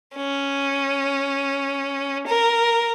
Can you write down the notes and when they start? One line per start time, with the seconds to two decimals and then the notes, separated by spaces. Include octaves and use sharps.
0.16 C#4
2.27 A#4